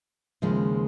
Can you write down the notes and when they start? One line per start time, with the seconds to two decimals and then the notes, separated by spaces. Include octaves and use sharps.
0.42 D#2 C#3 F3 G#3